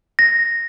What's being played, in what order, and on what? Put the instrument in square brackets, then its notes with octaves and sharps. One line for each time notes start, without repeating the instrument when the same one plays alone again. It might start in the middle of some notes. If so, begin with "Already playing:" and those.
[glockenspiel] A#6